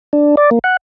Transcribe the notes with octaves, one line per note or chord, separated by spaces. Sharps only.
D4
D5
A#3
F#5